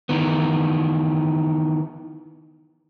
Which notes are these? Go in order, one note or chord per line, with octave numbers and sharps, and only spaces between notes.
D#3 E3 B3